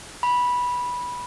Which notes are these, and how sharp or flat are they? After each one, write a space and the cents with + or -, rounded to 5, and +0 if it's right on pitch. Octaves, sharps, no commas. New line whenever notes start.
B5 -10